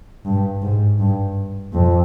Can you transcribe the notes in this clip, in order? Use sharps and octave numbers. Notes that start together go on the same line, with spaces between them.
G2
G#2
G2
F2